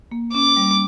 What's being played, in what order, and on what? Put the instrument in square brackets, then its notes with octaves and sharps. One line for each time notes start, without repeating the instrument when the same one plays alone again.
[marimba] A#3
[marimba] C#4 [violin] D6
[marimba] G3